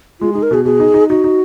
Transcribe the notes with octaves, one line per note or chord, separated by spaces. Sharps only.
G#3 F4
D#4 G#4
A#4
B2 G#4
B2 G#4
D#4
D#4
D#4 F#4
D#4